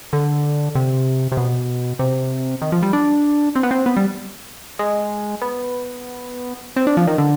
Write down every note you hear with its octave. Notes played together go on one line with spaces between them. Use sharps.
D3
C3
C3
B2
C3
D#3
F3
G3
D4
C4
B3
C4
B3
G3
G#3
B3
C4
D4
F3
D#3
D3